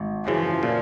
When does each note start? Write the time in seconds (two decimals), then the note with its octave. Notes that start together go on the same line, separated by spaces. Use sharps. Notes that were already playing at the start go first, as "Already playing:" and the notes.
Already playing: G#1
0.26 F#2 C#3 E3 F3
0.63 A#2